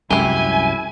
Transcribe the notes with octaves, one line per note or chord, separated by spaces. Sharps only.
C2 F#2 G#3 E4 G4 G#5